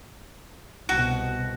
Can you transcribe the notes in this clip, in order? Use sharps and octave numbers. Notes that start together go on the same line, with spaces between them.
C2 B2 F#4